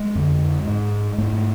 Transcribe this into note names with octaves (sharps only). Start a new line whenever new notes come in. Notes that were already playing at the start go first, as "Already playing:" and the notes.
Already playing: G#3
F2 D3
G#2
G#2 A3